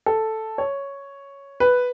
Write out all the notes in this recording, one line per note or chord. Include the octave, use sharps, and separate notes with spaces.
A4
C#5
B4